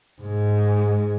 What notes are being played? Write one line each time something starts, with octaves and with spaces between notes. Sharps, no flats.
G#2 G#3